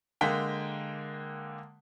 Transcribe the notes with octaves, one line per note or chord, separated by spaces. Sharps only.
D3 G#3 A#3 G5 B6